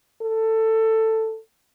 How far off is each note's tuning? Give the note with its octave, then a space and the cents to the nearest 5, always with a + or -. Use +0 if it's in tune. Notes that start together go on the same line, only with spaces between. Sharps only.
A4 +15